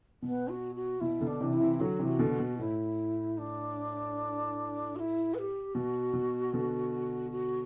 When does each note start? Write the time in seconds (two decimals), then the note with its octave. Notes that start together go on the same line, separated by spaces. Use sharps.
0.22 B2 B3
0.49 F#4
0.75 F#4
1.01 B2 E4
1.21 B2 D3
1.27 D4
1.41 C3 E3
1.53 E4
1.60 C3 E3
1.80 D3 F#3 F#4
1.99 C3 E3
2.06 F#4
2.19 B2 D3
2.32 F#4
2.39 B2
2.59 A2 E4
3.38 D4
4.96 F#4
5.00 E4
5.34 B4
5.39 G4
5.74 B2 F#4
6.13 B2
6.53 B2 D3
7.32 F#4